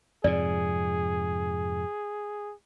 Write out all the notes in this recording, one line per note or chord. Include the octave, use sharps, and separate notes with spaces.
F2 G#2 C3 G#4 D5